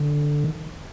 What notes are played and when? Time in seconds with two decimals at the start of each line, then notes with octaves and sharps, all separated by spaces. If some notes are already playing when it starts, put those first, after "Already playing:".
Already playing: D3
0.44 D#3